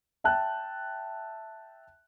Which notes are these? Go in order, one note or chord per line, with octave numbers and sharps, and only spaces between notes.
E5 G5 A5 F#6